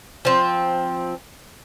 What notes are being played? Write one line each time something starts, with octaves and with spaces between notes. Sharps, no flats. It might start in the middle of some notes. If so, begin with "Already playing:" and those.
F3 C4